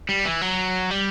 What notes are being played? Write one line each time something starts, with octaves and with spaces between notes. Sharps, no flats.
G3
E3
F#3
G3